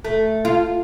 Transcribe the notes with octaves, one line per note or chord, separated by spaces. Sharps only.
A3
F4